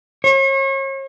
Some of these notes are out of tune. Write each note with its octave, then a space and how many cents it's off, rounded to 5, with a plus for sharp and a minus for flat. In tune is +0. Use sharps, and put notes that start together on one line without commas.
C#5 -40